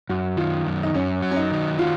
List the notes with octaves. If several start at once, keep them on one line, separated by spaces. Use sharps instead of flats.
F#2 F#4
D#3 F4
F#2
D#4
F#2 C#4
F#3
C#4
D#4
D#3
F4 F#4